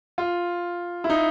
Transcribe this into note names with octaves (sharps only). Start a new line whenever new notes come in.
F4
E4
D#4